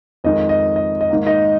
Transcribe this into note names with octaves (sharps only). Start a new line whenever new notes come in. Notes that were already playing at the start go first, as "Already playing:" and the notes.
F2 D#3 G#3 D#5
D#5
D#5
D#5
G#2 D#3 A#3
D#4 D#5